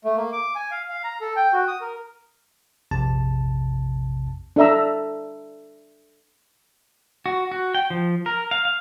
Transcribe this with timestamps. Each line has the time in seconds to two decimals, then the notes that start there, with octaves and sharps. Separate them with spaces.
0.05 A3
0.17 A#3
0.32 D6
0.55 G#5
0.71 F5
0.89 F5
1.04 A#5
1.21 A4
1.36 G5
1.53 F#4
1.68 D#6
1.81 A#4
2.91 A#1 F2 C3 A5
4.56 D4 A4 E5 A#5 E6
7.26 F#4
7.52 F#4
7.75 G5
7.90 F3
8.26 A#4
8.51 F5
8.65 F5